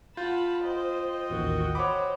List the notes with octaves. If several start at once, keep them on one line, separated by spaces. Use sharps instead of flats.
F4 F#5 A5 B5 G6
C5 D#5 G5
A1 D#2 D#3 F#4
C5 C#5 F#5 B5 D6